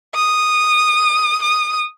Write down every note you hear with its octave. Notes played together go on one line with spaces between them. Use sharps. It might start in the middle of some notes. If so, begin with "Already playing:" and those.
D#6
D#6